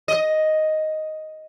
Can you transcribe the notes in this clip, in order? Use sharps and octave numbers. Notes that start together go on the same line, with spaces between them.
D#5